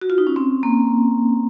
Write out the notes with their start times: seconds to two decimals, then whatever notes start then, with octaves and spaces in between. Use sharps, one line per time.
0.01 F#4
0.10 F4
0.18 D#4
0.27 C#4
0.36 C4
0.63 A#3